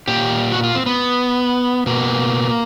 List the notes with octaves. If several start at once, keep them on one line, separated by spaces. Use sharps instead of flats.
A#2 G4
F#4
F4
C4
B3
B2 A#3